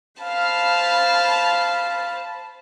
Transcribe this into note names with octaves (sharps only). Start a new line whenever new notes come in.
C5 F5 A5 B5